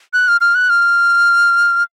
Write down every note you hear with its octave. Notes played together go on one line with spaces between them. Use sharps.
F#6
F6
F6
F#6
F6